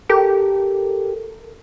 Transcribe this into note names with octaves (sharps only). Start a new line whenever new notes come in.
G4 A4 A#4